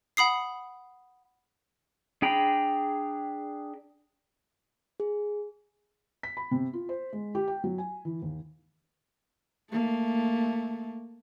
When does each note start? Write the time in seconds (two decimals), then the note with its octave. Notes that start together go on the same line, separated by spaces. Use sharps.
0.17 F#5 B5 D#6 C7
2.22 D4 G#4 G5 A#5 B5
5.00 G#4
6.23 B6
6.37 B5
6.51 C3
6.73 F4
6.89 C5
7.12 G#3
7.35 G4
7.48 G5
7.64 F#3
7.78 G#5
8.05 E3
8.22 D#2
9.72 A3 A#3